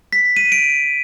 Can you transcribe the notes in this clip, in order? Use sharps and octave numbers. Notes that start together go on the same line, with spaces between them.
B6
D#7
D7